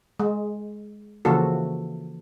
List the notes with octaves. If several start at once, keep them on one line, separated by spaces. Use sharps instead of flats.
G#3
C#3 E3 F3 A#3 F#4 A4